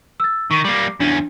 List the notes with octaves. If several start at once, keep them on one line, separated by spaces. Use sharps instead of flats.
E6 A6
D#3 C#6 B6 D#7
G3 A#3 D6 C7
E2 C#4 D4